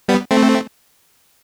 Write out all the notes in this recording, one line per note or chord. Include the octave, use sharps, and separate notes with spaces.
G3 B3
A3 C4